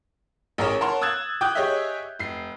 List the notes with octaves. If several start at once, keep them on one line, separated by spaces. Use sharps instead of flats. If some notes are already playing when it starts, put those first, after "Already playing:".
A1 G#4 A#4 C#5 D#6 E7
A#4 C#5 F#5 A5 C6
D#6 E6 F#6 G#6 A6 E7
G5 D6 D#6 F#6 G6
G4 G#4 C#5 D#5 E5
F1 C7